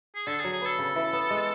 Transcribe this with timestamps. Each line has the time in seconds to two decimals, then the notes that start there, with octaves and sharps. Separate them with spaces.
0.15 G#4
0.27 D3 A4
0.39 G#4
0.44 F#3
0.53 G#4
0.61 B3 A4
0.79 C#3
0.96 E3
1.13 B3
1.30 G#3